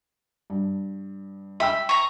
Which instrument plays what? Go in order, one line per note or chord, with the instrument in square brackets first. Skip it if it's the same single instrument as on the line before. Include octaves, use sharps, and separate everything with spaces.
[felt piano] G2
[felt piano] E5 G5 E6 [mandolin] B5
[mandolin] A#5 C#6